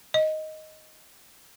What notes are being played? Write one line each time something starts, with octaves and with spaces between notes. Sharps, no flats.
D#5